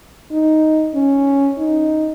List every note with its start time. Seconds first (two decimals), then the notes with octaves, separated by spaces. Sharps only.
0.32 D#4
0.95 C#4
1.58 D#4